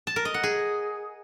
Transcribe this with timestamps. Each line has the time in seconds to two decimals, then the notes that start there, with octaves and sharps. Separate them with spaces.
0.07 A5
0.16 A#4
0.25 D#5
0.34 F#5
0.43 G#4